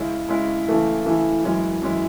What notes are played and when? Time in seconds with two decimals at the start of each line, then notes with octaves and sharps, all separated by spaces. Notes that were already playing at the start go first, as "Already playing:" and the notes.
Already playing: C#3 G#3 C#4 E4
0.28 C#3 G#3 C#4 E4
0.67 C#3 E3 A3 E4
1.05 C#3 E3 A3 E4
1.44 F#2 E3 G#3 C#4 E4
1.82 F#2 E3 G#3 C#4 E4